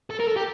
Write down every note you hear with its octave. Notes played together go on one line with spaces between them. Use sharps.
A4
A#4
A4
G4